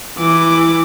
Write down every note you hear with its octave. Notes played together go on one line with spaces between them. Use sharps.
E3 D6